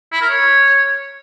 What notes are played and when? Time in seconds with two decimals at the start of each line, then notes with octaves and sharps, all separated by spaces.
0.12 E4
0.21 A#4
0.30 C#5